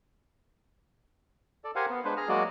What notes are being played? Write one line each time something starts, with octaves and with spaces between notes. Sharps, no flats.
A4 D5
G4 A#4 C5 F5 F#5 G#5
B3
G#3 D4 B4 C5
G#4 A#5 F6
F#3 G#3 A#3 F#4 D5 D#5